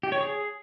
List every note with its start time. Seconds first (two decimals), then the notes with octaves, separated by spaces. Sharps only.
0.03 G4
0.12 C#5
0.21 G#4